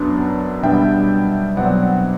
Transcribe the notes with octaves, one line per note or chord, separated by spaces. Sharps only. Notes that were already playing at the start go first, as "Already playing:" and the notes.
Already playing: F#2 F#3 B3 D4
B2 G3 B3 D4 E5 G5
B2 F#3 C4 D5 F#5